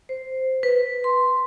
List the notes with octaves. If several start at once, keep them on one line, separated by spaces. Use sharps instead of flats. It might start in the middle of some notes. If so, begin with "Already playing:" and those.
C5
B4
C6